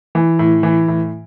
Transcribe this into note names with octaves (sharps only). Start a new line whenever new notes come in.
E3
A2
E3
A2